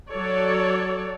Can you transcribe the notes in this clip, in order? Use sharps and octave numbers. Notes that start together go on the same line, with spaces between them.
F#3 A4 C#5 D5